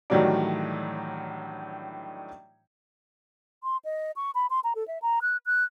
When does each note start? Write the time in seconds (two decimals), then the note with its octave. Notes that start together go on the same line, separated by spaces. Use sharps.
0.10 A2 D#3 E3 F#3 G3 D4
3.63 C6
3.85 D#5
4.16 C#6
4.35 B5
4.50 C6
4.64 A#5
4.75 A4
4.88 E5
5.02 A#5
5.22 F#6
5.46 F#6